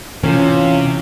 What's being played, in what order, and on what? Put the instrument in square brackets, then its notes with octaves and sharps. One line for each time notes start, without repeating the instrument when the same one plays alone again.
[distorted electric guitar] C3 [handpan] E3 [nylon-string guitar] C#4 [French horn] F4